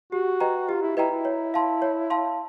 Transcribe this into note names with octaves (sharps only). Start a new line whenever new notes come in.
F#4 G4
B4 D#5 G5 A#5
F4 G4
E4
E4 B4 D#5 G5 A#5
E4
C#5
F5 A5 C6
C#5
F5 A5 C6